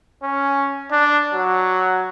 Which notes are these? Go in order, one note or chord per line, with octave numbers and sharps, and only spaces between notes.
C#4
D4
F#3